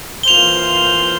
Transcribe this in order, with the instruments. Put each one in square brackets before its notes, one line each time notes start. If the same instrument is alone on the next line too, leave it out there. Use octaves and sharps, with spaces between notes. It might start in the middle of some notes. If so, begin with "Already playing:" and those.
[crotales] G7
[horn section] E3 A#3 F4 C5 [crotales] F7